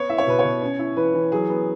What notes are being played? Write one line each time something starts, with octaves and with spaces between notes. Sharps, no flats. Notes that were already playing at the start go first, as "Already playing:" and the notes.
Already playing: B3 C#5
E4 E5
C#5
B2 B4
B2 C#5
C#4
E4
E3 B4
E3
F#3 G#4
B3